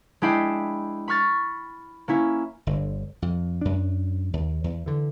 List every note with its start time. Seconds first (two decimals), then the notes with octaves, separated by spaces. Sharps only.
0.22 G#3 D4 E4 G5 B5 C7
1.08 B5 C#6 F6 A6
2.08 A#3 C#4 E4
2.67 G1 D3
3.22 F2
3.61 F#2 D4
4.33 D#2
4.64 E2
4.86 D3 E3